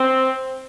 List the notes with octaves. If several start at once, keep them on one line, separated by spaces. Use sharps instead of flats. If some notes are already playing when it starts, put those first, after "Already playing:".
Already playing: C4